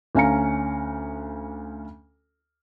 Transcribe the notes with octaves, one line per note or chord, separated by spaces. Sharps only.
D2 C#4 F5 A#5 C#7